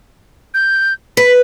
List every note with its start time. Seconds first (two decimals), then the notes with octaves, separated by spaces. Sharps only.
0.54 G6
1.17 B4 B6